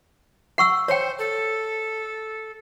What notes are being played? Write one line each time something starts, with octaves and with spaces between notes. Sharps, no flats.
F#5 C#6 E6
C5 C#5 G5
A4